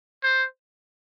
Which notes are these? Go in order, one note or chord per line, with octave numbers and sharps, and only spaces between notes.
C5